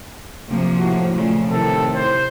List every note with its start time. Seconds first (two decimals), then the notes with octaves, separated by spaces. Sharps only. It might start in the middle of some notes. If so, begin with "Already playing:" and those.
0.49 C3 F3 A#3
0.79 A2 F#4
1.13 A#2 C#3 F3 A3
1.52 A2 C3 D#3 A4
1.95 C5